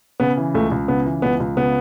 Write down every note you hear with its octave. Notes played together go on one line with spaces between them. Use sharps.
C#3 B3
E3
C#2 A3
C#2
C#3 B3
E3
C#2 B3
C#2
C#3 B3